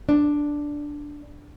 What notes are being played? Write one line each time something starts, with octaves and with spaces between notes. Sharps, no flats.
D4